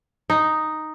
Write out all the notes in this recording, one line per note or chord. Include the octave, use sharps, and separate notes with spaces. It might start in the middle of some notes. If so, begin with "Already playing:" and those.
D#4